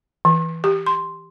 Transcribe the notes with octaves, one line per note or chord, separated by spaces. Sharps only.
E3
G4
C6